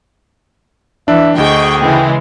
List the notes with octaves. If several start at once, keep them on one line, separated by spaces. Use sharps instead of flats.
E3 D4 E5
D2 G#4 D#5 G5 C#6
C#3 E3 G#3 G5